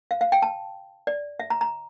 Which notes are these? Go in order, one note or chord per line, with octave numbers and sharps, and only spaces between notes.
F5
F5
G5
A5
D5
E5
A#5
A#5